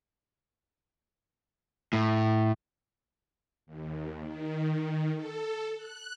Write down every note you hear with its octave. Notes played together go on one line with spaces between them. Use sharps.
A2
D#2
D#3
A4
F#6